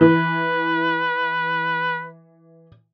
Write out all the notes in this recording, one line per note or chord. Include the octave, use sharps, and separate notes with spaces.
E3 B4